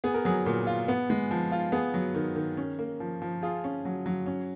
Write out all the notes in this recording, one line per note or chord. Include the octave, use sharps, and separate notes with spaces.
B3 G#4
A#4
F#3 G#4
A#2
F4
B3
G#3
F3
F4
B3 G#4
F#3
D#3
D#3
C#4
A#3
F3
F3
F4 G#4
C#4
F#3
F#3
C#4